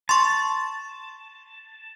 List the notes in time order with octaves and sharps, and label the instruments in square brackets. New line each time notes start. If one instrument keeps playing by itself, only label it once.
[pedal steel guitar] A5 [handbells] C6 C#6